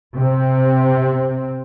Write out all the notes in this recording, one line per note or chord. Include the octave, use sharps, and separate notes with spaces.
C3 C4